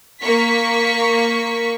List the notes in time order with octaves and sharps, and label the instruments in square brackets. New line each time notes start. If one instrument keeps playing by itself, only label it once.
[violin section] A#3 C#6 B6